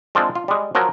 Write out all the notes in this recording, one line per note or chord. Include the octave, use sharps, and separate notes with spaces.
G#3 C4 D4 F4
F4
G3 G#3
F3 F#3 A#4